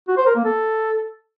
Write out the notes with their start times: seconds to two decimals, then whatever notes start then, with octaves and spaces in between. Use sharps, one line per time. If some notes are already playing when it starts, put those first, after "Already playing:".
0.08 F#4
0.17 C5
0.26 A#4
0.36 A#3
0.45 A4